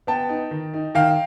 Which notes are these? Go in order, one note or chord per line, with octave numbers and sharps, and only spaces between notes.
B3 G5 A5
D#4
D#3
D#4
D#3 F5 G5